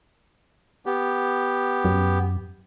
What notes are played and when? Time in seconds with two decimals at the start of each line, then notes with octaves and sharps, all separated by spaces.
0.86 B3 G4
1.85 F#2